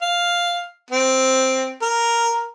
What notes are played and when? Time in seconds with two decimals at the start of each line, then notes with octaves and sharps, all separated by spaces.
0.02 F5
0.90 C4
1.82 A#4